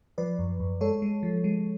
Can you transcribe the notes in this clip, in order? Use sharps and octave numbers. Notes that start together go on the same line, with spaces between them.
F3 B4 D5
F#2
F#2
G#3 A4 C#5
G#3
F3
G#3